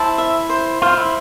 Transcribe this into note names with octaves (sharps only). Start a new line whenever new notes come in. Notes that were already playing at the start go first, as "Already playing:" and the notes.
Already playing: E4 C5 A5
E5
C5
F4 C5
E4